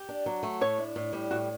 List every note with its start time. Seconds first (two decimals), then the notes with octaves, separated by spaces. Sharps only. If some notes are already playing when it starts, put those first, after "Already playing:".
Already playing: G4
0.09 D4
0.26 F#3
0.43 A3
0.61 A2 C#5
0.78 D4
0.96 A2
1.13 G3
1.31 A2 F#4